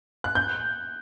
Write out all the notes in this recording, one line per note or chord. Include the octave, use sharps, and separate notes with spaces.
F#6
G6